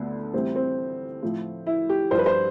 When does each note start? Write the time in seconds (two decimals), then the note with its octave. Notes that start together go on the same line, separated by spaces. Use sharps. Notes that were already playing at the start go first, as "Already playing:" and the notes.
Already playing: D2 D3 B3
0.33 A2 E3 G3 C4
0.56 C4
1.23 A2 F3
1.67 E4
1.89 G4
2.11 G2 C5
2.14 F3 B4
2.26 C5